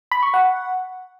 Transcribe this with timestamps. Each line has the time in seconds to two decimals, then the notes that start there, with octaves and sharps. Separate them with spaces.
0.11 B5
0.23 C#6
0.34 F#5